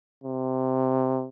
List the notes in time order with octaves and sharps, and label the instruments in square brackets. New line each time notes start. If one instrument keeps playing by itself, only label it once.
[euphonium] C3